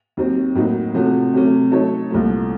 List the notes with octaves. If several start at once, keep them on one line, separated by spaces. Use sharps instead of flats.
D#2 D#3 F#3 C4
A2 F#3 A#3 D#4 F#4
C3 F3 A3 C#4 F#4
C3 F#3 A3 C#4
F#3 A3 D#4 A4 C#5
C2 A#2 F3 A3